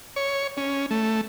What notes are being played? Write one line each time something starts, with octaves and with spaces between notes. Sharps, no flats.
C#5
C#4
A3